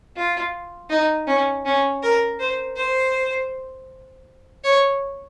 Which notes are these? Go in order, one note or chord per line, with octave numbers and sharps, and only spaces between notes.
F4
D#4
C#4
C#4
A#4
C5
C5
C#5